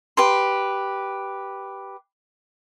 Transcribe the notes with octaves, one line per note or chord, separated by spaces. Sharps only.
G4 B4 C6